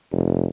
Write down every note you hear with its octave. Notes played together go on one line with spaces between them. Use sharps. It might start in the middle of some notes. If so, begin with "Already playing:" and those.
F1